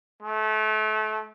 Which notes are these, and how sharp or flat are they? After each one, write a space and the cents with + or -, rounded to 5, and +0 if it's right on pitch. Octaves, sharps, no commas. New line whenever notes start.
A3 -30